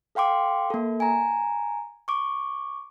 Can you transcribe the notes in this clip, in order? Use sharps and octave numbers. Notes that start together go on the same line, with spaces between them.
A4 F5 G5 C6 D6
A#3 A4
G#5 A#5
C#6 D6